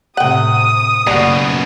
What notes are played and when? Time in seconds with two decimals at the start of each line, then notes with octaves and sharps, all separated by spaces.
0.17 A2 C3 F#5 G5 D#6
1.07 F#1 F#2 B2 G3 F#5